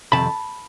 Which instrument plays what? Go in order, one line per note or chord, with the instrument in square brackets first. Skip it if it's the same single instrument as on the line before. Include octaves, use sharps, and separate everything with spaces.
[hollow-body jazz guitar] F2 C3 D#3 A5 B5